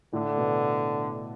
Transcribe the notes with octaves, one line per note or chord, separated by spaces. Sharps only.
A2 D3
B2